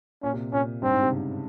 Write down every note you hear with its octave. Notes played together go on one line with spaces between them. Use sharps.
A#2 C#4
C3
A#2 C#4
G2 C4
G#2
C3
C#3